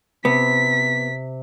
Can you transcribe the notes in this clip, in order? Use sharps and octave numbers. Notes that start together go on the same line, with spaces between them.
C3 B3 B6